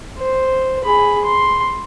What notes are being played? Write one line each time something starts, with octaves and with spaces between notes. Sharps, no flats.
C5
G#4 B5
C6